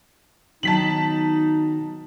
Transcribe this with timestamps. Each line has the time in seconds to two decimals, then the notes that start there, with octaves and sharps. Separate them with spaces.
0.63 B2 D#3 F#3 D#4 A5 B6 F#7